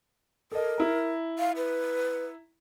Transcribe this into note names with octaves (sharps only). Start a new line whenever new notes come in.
A4 A#4 D#5
E4 A#5
F5
B4